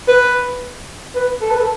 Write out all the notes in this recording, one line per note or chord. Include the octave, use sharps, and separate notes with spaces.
B4
B4
A4
B4
A4